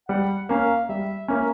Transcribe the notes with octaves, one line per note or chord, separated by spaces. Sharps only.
G3 F#5
A#3 C#4 F5
G3 E5
A#3 C#4 E5